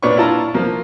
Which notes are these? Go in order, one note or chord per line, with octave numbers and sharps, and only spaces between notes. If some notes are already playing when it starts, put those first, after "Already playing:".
A#2 D4 B4 C#5 C#6
E4 F4 A5 A#5
F3 A#3